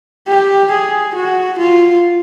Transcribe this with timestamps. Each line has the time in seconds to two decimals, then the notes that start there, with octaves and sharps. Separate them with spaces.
0.28 G4
0.71 G#4
1.15 F#4
1.58 F4